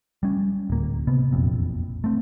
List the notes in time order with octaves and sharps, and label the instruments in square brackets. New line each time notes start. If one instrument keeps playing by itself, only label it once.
[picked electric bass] G3 C#4
D1 A#3
C3 B3
E1 A#1 F2
A3 C4